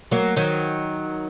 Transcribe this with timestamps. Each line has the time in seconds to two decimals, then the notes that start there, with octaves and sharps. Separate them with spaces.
0.11 F#3 A#3
0.36 D#3 F#3